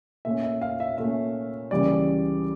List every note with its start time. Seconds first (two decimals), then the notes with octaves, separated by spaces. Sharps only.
0.25 A#2 A3 C#4 E5
0.43 E5
0.61 F5
0.80 E5
0.98 A#2 A3 C#4 E5
1.71 C#2 C#3 E3 G3 A#3 D5